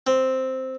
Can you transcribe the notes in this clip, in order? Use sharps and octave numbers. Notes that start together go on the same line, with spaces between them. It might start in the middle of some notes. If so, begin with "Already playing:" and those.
C4